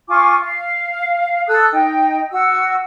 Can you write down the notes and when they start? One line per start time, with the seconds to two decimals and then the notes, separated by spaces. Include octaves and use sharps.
0.08 F4 G#5 C#6 D6
0.42 F5
1.47 A4 D#6 E6 F#6
1.71 D#4 G5
2.30 F#4 E6